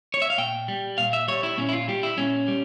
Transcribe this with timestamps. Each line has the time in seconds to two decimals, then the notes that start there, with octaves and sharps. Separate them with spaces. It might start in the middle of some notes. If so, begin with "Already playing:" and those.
0.14 C#5
0.22 E5
0.30 F5
0.38 A#2 G5
0.68 G3
0.98 A#2 F5
1.13 E5
1.28 G3 C#5
1.43 E4
1.58 A#2 C#4
1.69 E4
1.73 F4
1.88 G3 G4
2.03 E4
2.18 A#2 C#4
2.48 G3